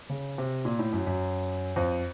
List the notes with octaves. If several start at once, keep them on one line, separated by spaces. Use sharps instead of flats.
C#3
C3
A#2
A2
F#2
F#2
F2